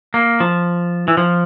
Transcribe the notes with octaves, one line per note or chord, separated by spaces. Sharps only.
A#3
F3
E3
F3